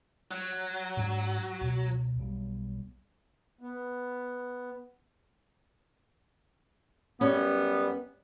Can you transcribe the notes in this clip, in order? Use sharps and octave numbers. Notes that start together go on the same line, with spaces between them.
F#3
G#2 D4
C#2 B2
B1 G3 B3
B3
F#2 G3 B3 C#4